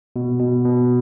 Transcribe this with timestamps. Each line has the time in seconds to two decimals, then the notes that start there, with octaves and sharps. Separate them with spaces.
0.16 B2
0.40 B2
0.65 B2